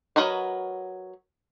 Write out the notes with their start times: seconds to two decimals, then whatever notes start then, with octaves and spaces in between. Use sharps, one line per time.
0.16 F#3 F#4 A#4 B4 D#5